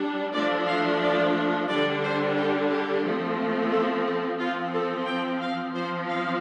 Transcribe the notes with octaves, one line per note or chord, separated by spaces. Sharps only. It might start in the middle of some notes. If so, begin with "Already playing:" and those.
Already playing: G3 D4
F3 A3 D4 D5
F5
D5
D3 G3 D4 D5
C5
G4
G4
F3 A3 C4
A4
A4
F3 C4 F4
A4
G5
F5
F3 C4 C5
F5